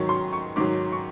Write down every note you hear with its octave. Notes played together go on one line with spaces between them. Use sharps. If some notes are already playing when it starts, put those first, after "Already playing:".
Already playing: G#2 D#3 F#3 C#6
C6
C#6
G#2 D#3 F#3 D6
C#6